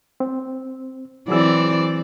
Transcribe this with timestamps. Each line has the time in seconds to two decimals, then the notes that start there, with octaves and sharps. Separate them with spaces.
0.20 C4
1.28 E3 F#3 C4 G#4 D5 E6